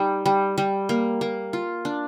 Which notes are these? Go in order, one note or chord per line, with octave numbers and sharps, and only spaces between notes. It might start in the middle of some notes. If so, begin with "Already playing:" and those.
Already playing: G3 D#4
G3
G3
A#3
A#3
F4
D4